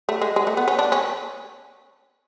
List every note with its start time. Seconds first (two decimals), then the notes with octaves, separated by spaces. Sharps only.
0.09 A3
0.22 G#3
0.36 G#3
0.47 A3
0.57 B3
0.68 C#4
0.79 D4
0.92 C#4